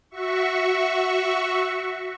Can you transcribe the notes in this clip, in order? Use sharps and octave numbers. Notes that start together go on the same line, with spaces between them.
F#4 E5 C#6